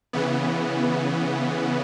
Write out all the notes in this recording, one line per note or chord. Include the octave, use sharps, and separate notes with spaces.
C#3 E3 B3